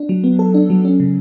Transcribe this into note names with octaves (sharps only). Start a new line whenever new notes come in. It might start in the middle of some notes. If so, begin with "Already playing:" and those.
Already playing: D4
F#3
B3
A4
D4
F#3
C#4
C#3